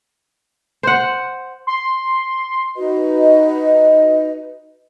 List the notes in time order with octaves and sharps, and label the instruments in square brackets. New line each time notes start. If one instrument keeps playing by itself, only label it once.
[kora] C5 F#5
[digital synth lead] C6
[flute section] D#4 F#4 B4 D#5